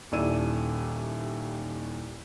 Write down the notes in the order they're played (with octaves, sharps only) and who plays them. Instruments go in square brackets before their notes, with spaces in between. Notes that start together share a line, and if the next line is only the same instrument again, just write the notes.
[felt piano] D#1 D#2 E4 D5 E6 D#7